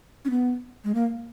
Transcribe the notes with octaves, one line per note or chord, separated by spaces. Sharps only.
C#4
B3
G#3
A#3